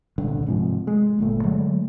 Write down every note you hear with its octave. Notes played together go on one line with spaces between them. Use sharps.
D#1 C2 G2 D3
G#2 C3 F3
G#3
G1 A#2 A3
D3 F#3 G#3 A3